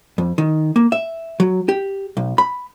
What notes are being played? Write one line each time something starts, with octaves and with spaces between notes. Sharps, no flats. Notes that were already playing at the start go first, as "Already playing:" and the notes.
F2
D#3
A#3
E5
F#3
G4
B1
B5